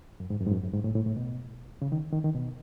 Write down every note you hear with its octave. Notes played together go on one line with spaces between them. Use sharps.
F#2
G#2
F#2
G#2
F#2
F#2
G#2
A2
A2
A2
B2
C#3
D#3
D#3
D#3
B2